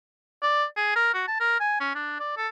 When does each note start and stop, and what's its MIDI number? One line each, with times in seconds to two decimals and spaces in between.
0.43 0.65 74
0.77 0.93 68
0.96 1.14 70
1.14 1.23 66
1.28 1.37 81
1.40 1.59 70
1.60 1.78 80
1.81 1.91 61
1.95 2.18 62
2.20 2.34 74
2.38 2.48 69